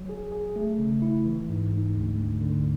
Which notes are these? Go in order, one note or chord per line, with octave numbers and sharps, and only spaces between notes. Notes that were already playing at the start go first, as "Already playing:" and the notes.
Already playing: F#3
G#4
G#4
A3
C#3
E4
E3
G#2
G#2
D2
D2
D3